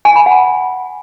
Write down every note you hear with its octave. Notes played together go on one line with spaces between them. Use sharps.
G#5
B5
F#5